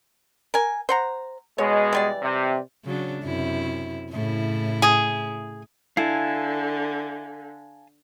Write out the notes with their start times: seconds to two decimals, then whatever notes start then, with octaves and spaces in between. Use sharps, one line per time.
0.54 A#4 G#5
0.89 C5 F#5 A#5
1.58 B2 G#3 C#5
1.93 E3 G3 D5
2.22 C3
2.84 C#3 F#3 D4
3.24 F#2 C3 E4
4.12 A2 C#3 E4
4.82 G#4
5.97 D3 E4 F5 G#5 A5